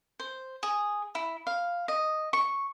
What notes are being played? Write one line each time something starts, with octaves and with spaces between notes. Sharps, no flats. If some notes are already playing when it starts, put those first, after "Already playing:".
C5
G#4
E4
F5
D#5
C#6